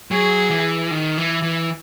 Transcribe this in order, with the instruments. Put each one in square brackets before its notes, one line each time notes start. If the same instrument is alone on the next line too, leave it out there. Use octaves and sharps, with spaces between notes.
[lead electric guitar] F#3 [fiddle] G#4
[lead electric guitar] E3
D#3
E3
E3